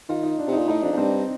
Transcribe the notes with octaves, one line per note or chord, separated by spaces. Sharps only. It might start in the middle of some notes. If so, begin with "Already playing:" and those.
D#3 F4
D#4
D4
C3
D#4
A#2
A2 D#4
F2 D4
F2
G2 C4